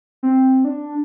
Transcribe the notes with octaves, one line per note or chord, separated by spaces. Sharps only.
C4
D4